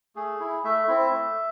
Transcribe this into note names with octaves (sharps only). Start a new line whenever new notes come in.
A3 G#4
E4
A3 E5
C4 E4
A3